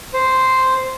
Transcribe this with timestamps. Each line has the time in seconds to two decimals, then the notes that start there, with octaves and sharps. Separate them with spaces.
0.13 C5